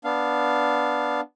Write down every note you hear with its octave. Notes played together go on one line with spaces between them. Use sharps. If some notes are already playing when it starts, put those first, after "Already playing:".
B3 D4 F5